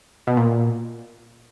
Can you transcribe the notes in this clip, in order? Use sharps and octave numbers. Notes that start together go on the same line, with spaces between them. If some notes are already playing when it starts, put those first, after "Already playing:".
B2
A#2